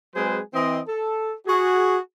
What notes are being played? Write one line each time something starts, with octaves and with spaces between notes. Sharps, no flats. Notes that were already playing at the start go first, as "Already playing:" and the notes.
F#3 G#3 C4 G#4 B4 C5
E3 C4 D#5
A4
F#4 G#4